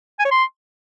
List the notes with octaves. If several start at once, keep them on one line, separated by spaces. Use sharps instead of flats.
G#5
C#5
C6